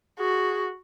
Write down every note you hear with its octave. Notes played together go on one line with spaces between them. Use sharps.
F#4 G#4